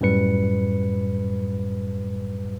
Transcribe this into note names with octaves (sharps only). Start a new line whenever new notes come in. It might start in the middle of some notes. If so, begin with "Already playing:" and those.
F#2 A2 G3 B4 C#7